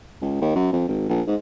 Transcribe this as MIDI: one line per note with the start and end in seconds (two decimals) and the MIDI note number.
0.22 0.40 37
0.41 0.53 39
0.55 0.68 42
0.73 0.85 41
0.89 1.08 32
1.09 1.22 34
1.27 1.35 44